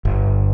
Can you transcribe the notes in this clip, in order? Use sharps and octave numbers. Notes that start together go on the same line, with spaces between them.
G1